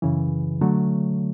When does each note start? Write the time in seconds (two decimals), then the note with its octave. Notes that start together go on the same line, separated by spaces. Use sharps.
0.02 F#2 C#3 E3
0.61 D3 F#3 A3